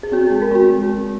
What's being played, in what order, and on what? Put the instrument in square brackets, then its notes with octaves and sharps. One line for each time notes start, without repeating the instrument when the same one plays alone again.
[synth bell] G#4
C4 F#4
G#3 G#4
A#4
C4 F#4
G#3
C4